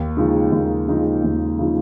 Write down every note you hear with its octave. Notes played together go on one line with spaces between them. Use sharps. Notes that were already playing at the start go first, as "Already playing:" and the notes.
Already playing: D#2
C#3 F3 G#3 D#4
D#2
C#3 F3 G#3 D#4
D#2
C#3 F3 G#3 D#4